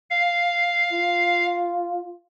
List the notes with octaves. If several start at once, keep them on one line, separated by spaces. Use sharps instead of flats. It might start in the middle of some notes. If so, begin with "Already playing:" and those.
F5
F4